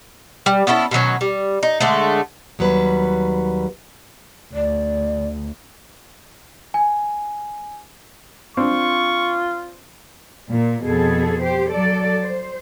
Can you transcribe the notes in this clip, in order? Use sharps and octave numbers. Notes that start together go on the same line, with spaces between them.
G3
B3 C#4 E4 A4
B2 D#3 F#3 C#4
G3
D#4
D3 G#3 A3
D#2 F#3 G3 B4
D2 D5
G#5
C4 D4 F4 C#6
A#2
F2 B2 G#4 A4
G4 C5
F#3 A4 D5
C5